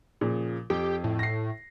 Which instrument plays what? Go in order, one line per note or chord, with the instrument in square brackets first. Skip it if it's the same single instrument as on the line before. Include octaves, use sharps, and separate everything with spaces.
[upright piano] A#2 C#3 F3
[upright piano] F2 [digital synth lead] G4
[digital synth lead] A2
[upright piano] A#6 C7